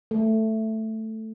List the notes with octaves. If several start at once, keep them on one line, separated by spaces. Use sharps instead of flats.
A3